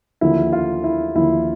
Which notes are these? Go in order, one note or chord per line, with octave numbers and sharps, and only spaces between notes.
D#2 D3 F3 E4
F4
E4
D#2 D3 F3 E4